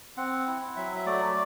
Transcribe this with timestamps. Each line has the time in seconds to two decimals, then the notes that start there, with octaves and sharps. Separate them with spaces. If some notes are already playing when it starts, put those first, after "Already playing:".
0.17 C4 F#5
0.47 E4
0.76 F#3 E5
0.96 E5
1.06 A3 D5